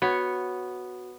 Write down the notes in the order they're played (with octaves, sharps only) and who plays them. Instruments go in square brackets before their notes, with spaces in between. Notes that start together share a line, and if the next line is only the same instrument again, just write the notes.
[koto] B3 C#5 [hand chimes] F#4